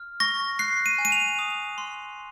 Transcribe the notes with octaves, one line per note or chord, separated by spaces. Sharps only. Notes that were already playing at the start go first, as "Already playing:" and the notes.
Already playing: F6
C#6 A#6
F#6 C7
D#7
G#5
D#7
F7
D#6
C6